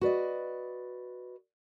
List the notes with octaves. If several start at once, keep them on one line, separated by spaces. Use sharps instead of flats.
F#4 B4 D5 D#5